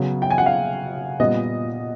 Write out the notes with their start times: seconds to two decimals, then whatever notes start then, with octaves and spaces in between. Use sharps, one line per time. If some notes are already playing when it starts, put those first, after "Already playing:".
Already playing: C#3 F#3 B3
0.22 G5
0.31 G#5
0.38 F#5
0.46 F5
1.20 A#2 G3 B3 D#5